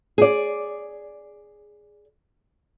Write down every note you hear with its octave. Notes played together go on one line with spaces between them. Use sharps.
G#4 D5